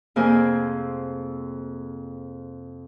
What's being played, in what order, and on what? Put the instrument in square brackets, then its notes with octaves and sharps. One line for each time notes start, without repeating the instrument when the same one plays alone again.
[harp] F2 C3 A#3 G#4 C5 G#5